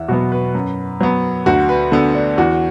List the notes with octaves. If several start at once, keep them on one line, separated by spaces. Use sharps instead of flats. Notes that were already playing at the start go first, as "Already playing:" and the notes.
Already playing: E2 E5 F#5
B2 F#3 B3 F#4
B4
F#2
F#3 B3
D2 F#4
B4
D3 B3 A4
D4
E2 F#4